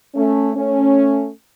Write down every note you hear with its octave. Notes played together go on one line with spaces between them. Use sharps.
A3 C#4
A3 C#4